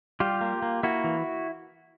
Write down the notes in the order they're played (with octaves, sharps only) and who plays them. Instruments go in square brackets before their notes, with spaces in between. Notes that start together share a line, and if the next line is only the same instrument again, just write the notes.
[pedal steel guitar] G3 F4 G4
A#3
A#3
A#3 E4 F#4
E3